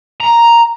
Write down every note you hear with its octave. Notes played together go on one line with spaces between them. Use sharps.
A#5